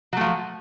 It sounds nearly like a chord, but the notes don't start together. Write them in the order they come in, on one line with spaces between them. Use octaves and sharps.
F#3 A3 F3